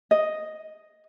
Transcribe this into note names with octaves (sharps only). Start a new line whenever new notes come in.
D#5